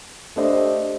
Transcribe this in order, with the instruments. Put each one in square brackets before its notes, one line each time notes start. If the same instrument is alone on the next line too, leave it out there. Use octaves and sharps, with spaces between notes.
[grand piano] A3 D4 G4 C5 D#5